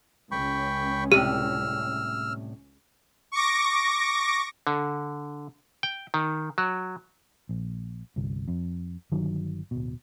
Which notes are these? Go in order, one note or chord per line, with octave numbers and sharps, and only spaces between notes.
C#2 C#4 G5 B5 C#6
A2 C3 G3 G4 E6 F6
C#6 D6 A#6
D3
G5
D#3
F#3
A#1
G1 C2
F2
G1 D#3 F#3
D1 B2